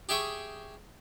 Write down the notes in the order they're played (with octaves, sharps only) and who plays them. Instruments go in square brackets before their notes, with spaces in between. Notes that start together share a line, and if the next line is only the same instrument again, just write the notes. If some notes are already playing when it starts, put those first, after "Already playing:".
[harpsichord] G4 G#4 E5 G5 C#6 D#6